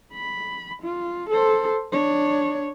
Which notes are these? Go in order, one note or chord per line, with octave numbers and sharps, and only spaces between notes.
B5
F4
A4 C5
D4 C#5